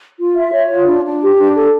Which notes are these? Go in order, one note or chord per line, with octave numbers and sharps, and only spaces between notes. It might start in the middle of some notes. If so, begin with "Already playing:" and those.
F4
E5
C#5
F4
D4
D4
G4
D4
A4